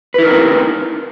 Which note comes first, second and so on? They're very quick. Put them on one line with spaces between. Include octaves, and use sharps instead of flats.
B4 E4 A#4 D#4 C4